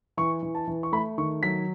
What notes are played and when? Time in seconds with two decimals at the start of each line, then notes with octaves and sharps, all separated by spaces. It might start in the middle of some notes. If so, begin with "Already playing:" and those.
0.17 E3 C#6
0.43 E3
0.55 A5
0.67 E3
0.83 C#6
0.92 A3 B5
1.18 D#3 C#6
1.43 F#3 B6